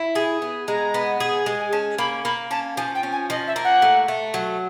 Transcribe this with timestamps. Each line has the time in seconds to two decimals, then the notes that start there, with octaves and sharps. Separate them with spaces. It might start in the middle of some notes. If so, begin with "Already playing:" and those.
Already playing: E4
0.15 G#4
0.42 B3
0.68 G#3 A#5
0.94 B3
1.20 G#4
1.46 G#3
1.60 G#5
1.72 C#4 A5
1.98 A#3 B5
2.25 A#3 B5
2.51 C#4 A5
2.77 F3 G#5
2.95 G5
3.03 C#4
3.12 G#5
3.30 F3 D#5
3.47 E5
3.56 A#3
3.64 F#5
3.82 A3
4.08 A3
4.34 F#3